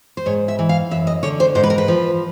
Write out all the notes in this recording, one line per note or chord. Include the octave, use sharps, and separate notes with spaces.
C5
G#2 C#5
E5
E3
F5
F#2 E5
D#5
D3 C#5
C5
G#2 C5
B4
A#4
B4
F3